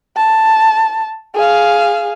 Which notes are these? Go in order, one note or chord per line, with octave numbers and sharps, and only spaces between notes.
A5
G#4 F5